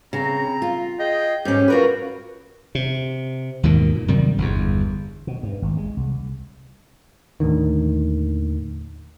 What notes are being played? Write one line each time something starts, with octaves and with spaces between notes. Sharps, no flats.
C#3 C4 A#5
F4
G#4 D#5 G5
G#2 C#4 G4
F4 F#4 A#4 B4
C3
D#2 G#2 B2 D#3
A#2
F#2 C3 D#3 G3
G1 E2
B2
G2
G#1
G#3
C2
D#2 A2 D3 D#3